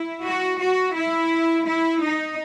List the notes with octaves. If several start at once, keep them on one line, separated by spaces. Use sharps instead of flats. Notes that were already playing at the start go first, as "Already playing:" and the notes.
Already playing: E4
F#4
F#4
E4
E4
D#4